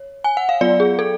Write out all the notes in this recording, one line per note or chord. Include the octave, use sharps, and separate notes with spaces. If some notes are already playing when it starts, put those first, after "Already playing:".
Already playing: C#5
G#5
F#5
F5
F#3 B3 F4 D5
G#4
A4